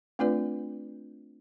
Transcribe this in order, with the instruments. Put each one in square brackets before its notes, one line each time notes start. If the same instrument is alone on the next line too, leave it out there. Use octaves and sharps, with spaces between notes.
[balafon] A3 C4 D4 F4 B4 D5